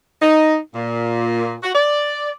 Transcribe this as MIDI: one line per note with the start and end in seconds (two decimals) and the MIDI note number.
0.22 0.57 63
0.75 1.56 46
1.63 1.72 66
1.75 2.31 74